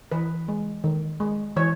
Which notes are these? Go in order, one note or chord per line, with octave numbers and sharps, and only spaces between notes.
E3 B4
G#3
D#3
G#3
E3 C#5